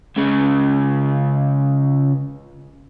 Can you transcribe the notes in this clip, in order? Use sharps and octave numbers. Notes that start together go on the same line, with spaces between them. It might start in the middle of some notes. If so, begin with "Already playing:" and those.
C#2 C#3